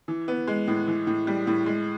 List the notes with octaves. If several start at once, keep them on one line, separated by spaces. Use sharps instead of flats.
E3
B3
G#3
A2
E3
A2
G3
A2
G#3